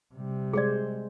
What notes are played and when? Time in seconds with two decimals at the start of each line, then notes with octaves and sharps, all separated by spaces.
0.15 C3 G3
0.53 G#3 G#4 C5 D5